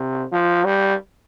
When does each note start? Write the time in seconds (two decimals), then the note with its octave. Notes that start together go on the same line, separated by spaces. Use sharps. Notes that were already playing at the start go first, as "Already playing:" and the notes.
Already playing: C3
0.32 F3
0.65 G3